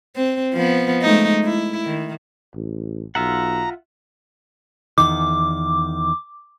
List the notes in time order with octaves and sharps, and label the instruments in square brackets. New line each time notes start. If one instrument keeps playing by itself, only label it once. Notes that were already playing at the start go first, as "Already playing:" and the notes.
[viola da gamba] C4
F3 B3
G#3 A3 D#4
E4
D#3
[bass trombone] A1
[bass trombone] B1 [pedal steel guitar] F4 E5 F#5 [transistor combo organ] A#5
[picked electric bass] E2 D#3 [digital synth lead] D6